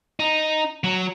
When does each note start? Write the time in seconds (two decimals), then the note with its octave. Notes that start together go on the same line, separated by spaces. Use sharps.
0.19 D#4
0.84 F#3